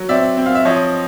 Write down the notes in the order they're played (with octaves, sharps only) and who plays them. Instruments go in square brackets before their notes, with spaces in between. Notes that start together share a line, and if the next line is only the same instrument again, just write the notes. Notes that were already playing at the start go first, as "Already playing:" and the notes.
Already playing: [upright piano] F#3
C4 D5 E5
C4
F5
E5
F3 C#5 D#5